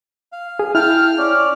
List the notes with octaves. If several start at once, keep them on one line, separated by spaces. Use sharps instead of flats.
F5
G#4
E4 F5 G5 A5 F6
C#4 D5